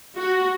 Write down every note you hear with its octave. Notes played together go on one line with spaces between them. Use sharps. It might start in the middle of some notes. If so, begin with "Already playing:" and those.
F#4